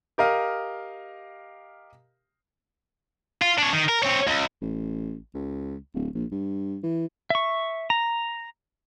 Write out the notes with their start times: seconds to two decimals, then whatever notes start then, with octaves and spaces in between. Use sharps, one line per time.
0.18 G4 A#4 D#5 F5
3.42 F4
3.58 D4 C#5
3.73 D#3
3.89 A#4
4.03 C4 C#5
4.27 C#2
4.62 A1
5.34 C#2
5.94 D1
6.14 A#1
6.32 G2
6.83 E3
7.30 E5 C#6
7.90 A#5